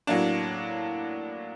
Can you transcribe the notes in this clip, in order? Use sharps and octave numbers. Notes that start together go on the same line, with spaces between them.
A2 F#3 A#3 D4